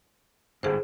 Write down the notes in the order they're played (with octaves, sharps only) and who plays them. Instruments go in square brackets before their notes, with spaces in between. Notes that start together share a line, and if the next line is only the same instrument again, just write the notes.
[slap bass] G1 G#2 [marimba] G#4 C5